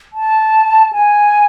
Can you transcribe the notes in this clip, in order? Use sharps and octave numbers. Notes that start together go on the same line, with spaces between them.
A5
G#5